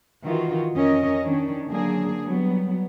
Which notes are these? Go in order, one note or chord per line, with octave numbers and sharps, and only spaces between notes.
D#3 E3 F4 F#4
F2 C#4 A#4 D#5
D#3 C#4 D4
D3 F#3 A#3 D4 G#4
F#3 G3 B3